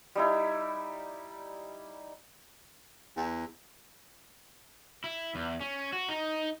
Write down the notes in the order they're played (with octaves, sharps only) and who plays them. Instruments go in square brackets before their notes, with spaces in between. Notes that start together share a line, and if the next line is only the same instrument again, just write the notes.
[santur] G3 D#4 E4
[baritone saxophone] E2
[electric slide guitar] E4
E2
C#4
F#4
D#4